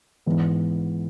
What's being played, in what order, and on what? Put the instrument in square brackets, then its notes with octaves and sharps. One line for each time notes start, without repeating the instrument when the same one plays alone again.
[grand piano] G#2 E3 B3